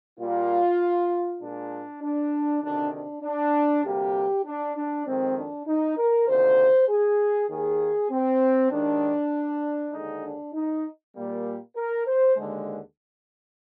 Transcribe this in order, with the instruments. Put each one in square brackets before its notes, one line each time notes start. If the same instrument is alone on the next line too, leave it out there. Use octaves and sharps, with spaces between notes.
[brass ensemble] A#2 G3 A#3 F4
A#2 G#3 D4
D4
D2 C3 D#3 D4
D4
D4
D2 C3 G3 A#3 G4
D4
D4
F2 D#3 G#3 C4
D4
D#4
A#4
D2 C3 D#3 A#3 C5
G#4
D#2 D#3 A#3 G#4
C4
D#2 D#3 G#3 D4
D#2 D3 G#3 D#4
D4
D#4
A#2 G3 A#3
A#4
C5
D#2 D3 G#3